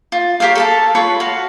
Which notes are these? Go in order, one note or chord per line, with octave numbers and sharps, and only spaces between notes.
F4
G4 A#4 C#5 F5
A4 F5 A5
F4 B4 C#5 C#6
F#4 F5